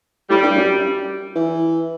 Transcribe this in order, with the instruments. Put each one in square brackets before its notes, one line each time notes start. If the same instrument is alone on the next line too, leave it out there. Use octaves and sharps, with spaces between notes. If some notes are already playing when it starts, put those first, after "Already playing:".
[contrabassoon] A2 [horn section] G3
[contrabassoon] G2
F#2
E3